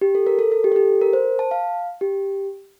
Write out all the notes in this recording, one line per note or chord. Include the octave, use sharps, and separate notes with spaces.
G4
A4
A#4
A4
A4
G4
A4
G4
A#4
C5
A5
F5
G4